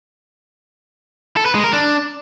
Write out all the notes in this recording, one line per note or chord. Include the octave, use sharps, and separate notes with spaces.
A4
B4
G#3
A#4
D4